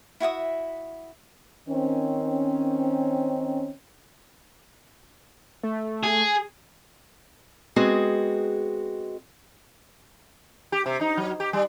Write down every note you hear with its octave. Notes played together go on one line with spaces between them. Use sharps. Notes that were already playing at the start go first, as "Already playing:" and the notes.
E4 F#4 E5 D#6
D#3 C4 C#4
A3
G#4
G#3 B3 C4 F#4 G#4
G4
C3
D#4
F#3
G4
G3